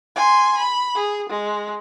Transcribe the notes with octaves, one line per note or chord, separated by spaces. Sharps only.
G#5 C6
B5
G#4
G#3